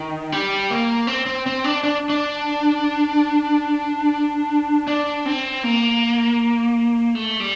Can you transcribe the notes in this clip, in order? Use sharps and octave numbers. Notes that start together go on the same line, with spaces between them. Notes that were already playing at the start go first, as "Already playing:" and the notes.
Already playing: D#3
G3
A#3
C4
C4
C4
D4
D4
D4
D4
C4
A#3
A3
G3